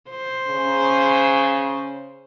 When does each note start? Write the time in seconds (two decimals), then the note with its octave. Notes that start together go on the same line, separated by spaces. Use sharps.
0.10 C5
0.47 C#3